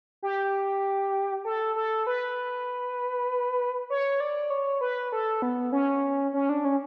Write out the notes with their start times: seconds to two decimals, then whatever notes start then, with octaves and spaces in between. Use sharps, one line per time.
0.23 G4
1.45 A4
1.76 A4
2.07 B4
3.90 C#5
4.20 D5
4.50 C#5
4.81 B4
5.12 A4
5.42 B3
5.72 C#4
6.33 C#4
6.49 D4
6.65 C#4